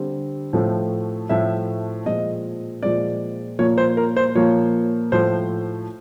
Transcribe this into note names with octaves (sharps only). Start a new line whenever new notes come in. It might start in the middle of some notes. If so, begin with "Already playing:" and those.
Already playing: D3 G3 C4
A2 F3 A3 C4
A2 F3 A3 C4 E5
A#2 F3 G#3 C4 D#5
A#2 F3 G#3 C4 D5
A#2 F3 A#3 C#5
C5
A#4
C5
A#2 F3 A#3 C#5
A2 F3 A3 C5